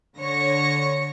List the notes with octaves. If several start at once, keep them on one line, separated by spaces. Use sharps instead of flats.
D3 C#5 A#6 C#7